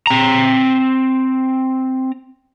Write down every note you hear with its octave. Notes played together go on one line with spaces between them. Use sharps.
C4 A#5